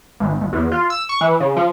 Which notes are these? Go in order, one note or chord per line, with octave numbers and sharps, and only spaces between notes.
G#1
G1
E2
F4
E6
C#6
E3
C#3
F3